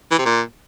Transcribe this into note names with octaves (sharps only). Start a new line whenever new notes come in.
E3
C3
A#2